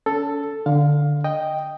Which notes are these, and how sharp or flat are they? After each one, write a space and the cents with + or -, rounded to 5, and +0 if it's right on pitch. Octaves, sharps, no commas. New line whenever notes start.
C#4 +40 A4 +5
D3 +0 F5 +15
D#5 +0 G5 +0